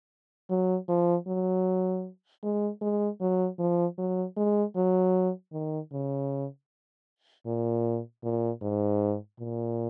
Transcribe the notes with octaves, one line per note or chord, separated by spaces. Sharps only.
F#3
F3
F#3
G#3
G#3
F#3
F3
F#3
G#3
F#3
D#3
C#3
A#2
A#2
G#2
A#2